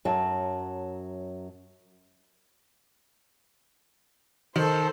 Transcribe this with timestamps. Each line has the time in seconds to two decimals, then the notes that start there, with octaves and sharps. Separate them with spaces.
0.05 F#2 F#3 F#4 A5
4.56 D#3 A4 C5